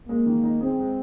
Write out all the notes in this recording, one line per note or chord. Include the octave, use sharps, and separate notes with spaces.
G#3 A#3
D#3
D#4
C4 G#4
G#3